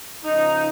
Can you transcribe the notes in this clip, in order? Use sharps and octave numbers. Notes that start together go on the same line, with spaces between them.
C#3 F3 D#4